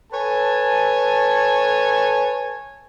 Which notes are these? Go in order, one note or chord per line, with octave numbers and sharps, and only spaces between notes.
A4 B4 C#5 G#5 A5